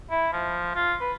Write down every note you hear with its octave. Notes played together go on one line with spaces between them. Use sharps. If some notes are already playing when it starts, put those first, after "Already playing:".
E4
F3
F4
B4